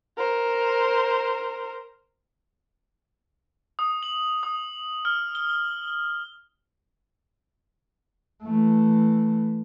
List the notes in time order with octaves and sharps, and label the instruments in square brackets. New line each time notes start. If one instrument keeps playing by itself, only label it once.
[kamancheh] A#4 C5
[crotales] D#6
F#7
D#6
F6
G7
[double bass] E3 A3